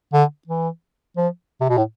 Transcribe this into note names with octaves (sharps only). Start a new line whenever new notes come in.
D3
E3
F3
C3
B2
A2